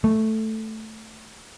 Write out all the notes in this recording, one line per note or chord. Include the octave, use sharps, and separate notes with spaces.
A3